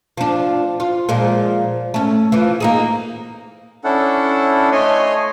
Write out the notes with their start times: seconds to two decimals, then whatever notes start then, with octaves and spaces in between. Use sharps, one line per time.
0.17 F3 D4
0.80 F4
1.09 A#2 F3 G#3
1.94 A3 C#4
2.32 E3 F3
2.60 A#3 D#4 G#4
3.84 C#4 D4 E4 A4 F#5
4.72 A3 C#5 D#5 G#5 C6